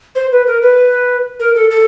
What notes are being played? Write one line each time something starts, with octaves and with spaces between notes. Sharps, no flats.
C5
B4
A#4
B4
A#4
A4
A4